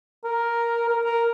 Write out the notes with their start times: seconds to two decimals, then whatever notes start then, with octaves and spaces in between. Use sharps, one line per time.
0.24 A#4
0.89 A#4
1.04 A#4